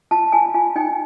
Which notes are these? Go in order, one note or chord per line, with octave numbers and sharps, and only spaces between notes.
F4 A5
F4 G#5
F4 G#5
D#4 G5